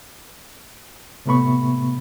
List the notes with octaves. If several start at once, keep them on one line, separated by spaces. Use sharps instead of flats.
A2 C3 A3 B3 B5 C#6